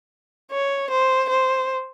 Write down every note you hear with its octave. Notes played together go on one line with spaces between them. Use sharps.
C#5
C5
C5